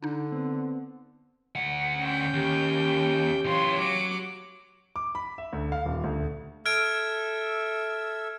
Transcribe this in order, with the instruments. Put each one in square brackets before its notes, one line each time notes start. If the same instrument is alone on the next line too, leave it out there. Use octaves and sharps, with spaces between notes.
[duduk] D3 [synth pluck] D4 D#4
[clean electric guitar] B3 C4
[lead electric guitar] D2 F#5
[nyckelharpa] C#4 G5
[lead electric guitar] D#2 [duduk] G4
[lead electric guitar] E3 F4 [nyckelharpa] C#5 C6
[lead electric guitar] F#3 [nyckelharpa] D6
[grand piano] D6
B5
E5
D2
F5
D#1
D2
[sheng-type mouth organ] A4 E5 E6 [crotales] F6 G#6 D7